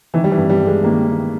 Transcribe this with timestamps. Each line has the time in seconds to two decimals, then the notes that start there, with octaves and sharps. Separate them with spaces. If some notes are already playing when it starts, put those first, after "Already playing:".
0.14 D#3 E3
0.24 G3
0.31 E3
0.37 G2
0.49 G3
0.61 G2
0.66 G#3
0.84 D#3 A#3
1.07 D#3